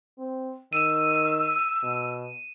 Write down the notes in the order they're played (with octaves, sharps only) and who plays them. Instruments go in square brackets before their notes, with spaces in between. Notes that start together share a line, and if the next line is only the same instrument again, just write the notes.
[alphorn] C4
[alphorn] D#3 [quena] E6 [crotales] D#7 E7
[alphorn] B2